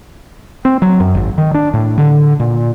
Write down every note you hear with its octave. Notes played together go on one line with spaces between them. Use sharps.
C4
F#3
F#2
G#1
D#3
D4
A2
D3
A#2